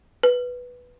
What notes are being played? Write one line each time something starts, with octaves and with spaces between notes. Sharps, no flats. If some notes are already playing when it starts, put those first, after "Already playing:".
B4